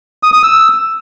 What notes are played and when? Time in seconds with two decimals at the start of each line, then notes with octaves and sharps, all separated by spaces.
0.23 D#6
0.33 D#6
0.43 E6